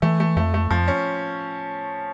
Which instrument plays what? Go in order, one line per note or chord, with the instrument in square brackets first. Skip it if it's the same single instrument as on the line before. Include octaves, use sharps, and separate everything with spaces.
[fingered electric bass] E3 [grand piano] A3
[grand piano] A3
[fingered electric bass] F2 [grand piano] A3
[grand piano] A3
[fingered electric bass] F2 [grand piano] F3
[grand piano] C#4